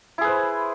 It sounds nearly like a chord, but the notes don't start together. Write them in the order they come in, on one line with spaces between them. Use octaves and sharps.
E4 G#4 B4 C5